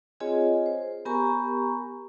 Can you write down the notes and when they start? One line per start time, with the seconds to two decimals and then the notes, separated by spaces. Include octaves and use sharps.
0.20 C4 F4 G#4 C#5 D#5 G#5
0.66 C5
1.05 B3 G4 A#4 G#5 A#5 C#6